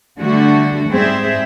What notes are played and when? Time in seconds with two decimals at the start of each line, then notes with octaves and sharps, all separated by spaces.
0.18 D3 G3 A3 F#4
0.89 G#2 G3 C4 G#4 C5 E5